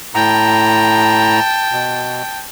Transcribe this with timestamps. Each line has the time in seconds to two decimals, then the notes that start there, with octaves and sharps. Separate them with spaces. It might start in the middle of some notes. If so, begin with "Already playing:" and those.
0.15 A2 G5 A5 A#5
1.72 B2